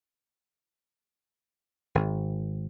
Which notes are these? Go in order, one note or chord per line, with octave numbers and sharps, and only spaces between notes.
G#1